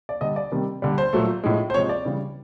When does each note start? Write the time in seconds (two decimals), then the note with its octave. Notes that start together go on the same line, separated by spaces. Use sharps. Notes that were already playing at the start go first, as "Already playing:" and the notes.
0.09 D5
0.21 D3 G3 D#5
0.36 D5
0.52 C3 D#3 G3
0.82 D3 G3
0.98 C5
1.13 A#2 F#3 A3
1.44 A2 F3 G#3
1.70 C5
1.74 C3 F3 G#3 C#5
1.89 D5
2.05 C#3 E3 G3